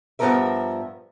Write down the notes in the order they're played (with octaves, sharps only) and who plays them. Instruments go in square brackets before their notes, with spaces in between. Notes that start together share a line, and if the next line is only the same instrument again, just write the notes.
[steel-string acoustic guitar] G2 B2 F3 B3 A#4 E5